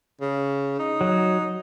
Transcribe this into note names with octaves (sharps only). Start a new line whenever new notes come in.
C#3
D#4
F#3